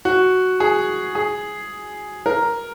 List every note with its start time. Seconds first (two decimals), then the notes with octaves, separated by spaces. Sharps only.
0.05 F#4
0.60 G#4
1.15 G#4
2.26 A#4